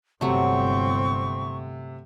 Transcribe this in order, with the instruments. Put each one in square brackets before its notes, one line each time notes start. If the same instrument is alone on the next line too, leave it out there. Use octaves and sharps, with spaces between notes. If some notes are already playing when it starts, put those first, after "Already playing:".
[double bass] G1 C4 [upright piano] C3 [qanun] F#3 A3 [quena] C#6